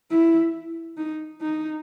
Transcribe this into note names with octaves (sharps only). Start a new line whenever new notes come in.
E4
D#4
D#4